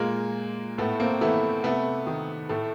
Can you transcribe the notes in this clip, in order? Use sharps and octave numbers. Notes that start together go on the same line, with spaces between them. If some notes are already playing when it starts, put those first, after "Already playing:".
Already playing: A#2 G#3 A#3
A2 A3 B3
A#3 C4
E3 A3 B3
C3 A3 B3
D#3
A2 A3